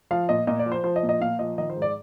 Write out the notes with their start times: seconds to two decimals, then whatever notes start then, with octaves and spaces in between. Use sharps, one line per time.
0.11 F3 F5
0.29 A#2 D#5
0.47 A#2 D#5
0.59 D5
0.66 F3
0.72 C5
0.84 F3 C5
0.96 D#5
1.03 A#2
1.09 D#5
1.21 A#2 F5
1.39 F3 D#5
1.58 D#3 D#5
1.70 C5
1.76 G#2
1.82 D5